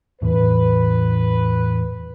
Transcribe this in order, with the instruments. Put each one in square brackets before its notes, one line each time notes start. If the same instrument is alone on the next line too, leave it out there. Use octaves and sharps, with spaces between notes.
[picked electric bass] E2 A2 E3 [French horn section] B4